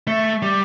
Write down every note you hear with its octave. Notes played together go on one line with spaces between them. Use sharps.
A3
G3